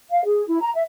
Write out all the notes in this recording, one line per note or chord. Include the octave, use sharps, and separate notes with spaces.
F5
G#4
E4
A#5
E5